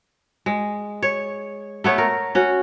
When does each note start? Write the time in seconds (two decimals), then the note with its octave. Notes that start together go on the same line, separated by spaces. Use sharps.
0.46 G#3
1.03 C#5
1.84 A3 B3 C#5
1.98 A#4
2.35 C#4 F#4